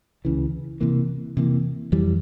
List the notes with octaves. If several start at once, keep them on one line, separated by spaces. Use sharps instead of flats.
C#2 C#3 E3
C3 E3 A#3
C3 E3 A#3
F2 E3 G3